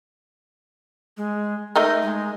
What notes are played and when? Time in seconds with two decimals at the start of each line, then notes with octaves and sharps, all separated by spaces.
1.17 G#3
1.76 A3 D#4 A#4 D#5
2.03 G#3